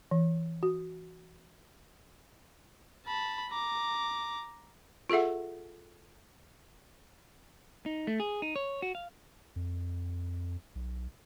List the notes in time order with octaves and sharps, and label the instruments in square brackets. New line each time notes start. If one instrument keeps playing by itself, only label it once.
[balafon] E3
F#4
[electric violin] A5 B5
A#5 D6
[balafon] F4 G#4 A4 E5 F#5
[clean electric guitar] D#4
A3
G#4
D#4
C#5
F#4
F5
[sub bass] F2
B1